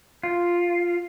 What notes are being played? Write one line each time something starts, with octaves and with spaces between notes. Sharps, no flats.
F4